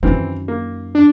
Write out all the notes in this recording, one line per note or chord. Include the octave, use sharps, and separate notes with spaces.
F#2 D#3 E3 C4
A#3
D4